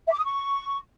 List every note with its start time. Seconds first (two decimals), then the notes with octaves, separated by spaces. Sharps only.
0.07 E5
0.12 D6
0.18 D#6
0.24 C#6